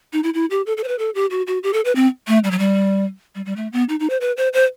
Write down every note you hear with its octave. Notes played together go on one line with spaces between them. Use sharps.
D#4
E4
E4
G4
A4
A4
C5
B4
A4
G4
F#4
F#4
G4
A4
B4
C4
A3
G3
F#3
G3
G3
G3
A3
B3
D#4
D#4
C5
B4
C5
C5